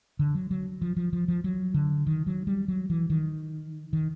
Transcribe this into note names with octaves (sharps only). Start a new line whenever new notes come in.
D3
F#3
F#3
F3
F3
F3
F3
F#3
D3
D#3
F#3
G3
F#3
E3
D#3
D#3